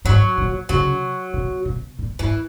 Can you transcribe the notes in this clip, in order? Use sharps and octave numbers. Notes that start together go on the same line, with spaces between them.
G#2 F#3
A#2
C#3 F#3
B2
B2
A#2
G#2 E3